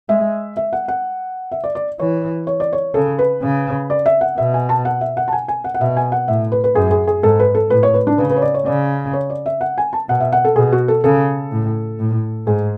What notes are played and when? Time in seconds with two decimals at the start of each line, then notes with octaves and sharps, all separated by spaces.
0.09 G#3 E5
0.57 E5
0.73 F#5
0.88 F#5
1.52 E5
1.64 D5
1.75 D5
1.99 E3 C#5
2.47 C#5
2.60 D5
2.73 C#5
2.94 C#3 A4
3.19 B4
3.42 C#3
3.90 D5
4.06 E5
4.21 F#5
4.38 B2 E5
4.54 G#5
4.69 A5
4.85 F#5
5.01 E5
5.17 F#5
5.28 A5
5.33 G#5
5.48 G#5
5.64 F#5
5.74 F#5
5.81 B2 E5
5.97 G#5
6.12 F#5
6.28 A2 E5
6.52 B4
6.64 B4
6.75 F#2 G#4
6.91 G#4
7.07 G#4
7.23 G#2 A4
7.39 B4
7.55 A4
7.70 A2 B4
7.83 C#5
7.94 B4
8.07 D4
8.18 C#3 B4
8.30 B4
8.37 C#5
8.42 D5
8.54 C#5
8.66 C#3 D5
9.13 C#5
9.30 D5
9.46 E5
9.61 F#5
9.78 G#5
9.93 A5
10.09 B2 F#5
10.20 E5
10.32 F#5
10.45 A4
10.56 B2 G#4
10.72 F#4
10.88 A4
11.04 C#3 A4
11.52 A2
11.99 A2
12.47 G#2 G#4